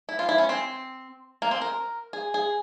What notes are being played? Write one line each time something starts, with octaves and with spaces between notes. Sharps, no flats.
E4
F4
E4
C#4
C4
A#3
C4
A#4
G#4
G#4